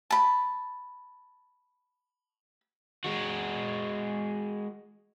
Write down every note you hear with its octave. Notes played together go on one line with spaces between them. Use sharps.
A5 B5
G#3 F#4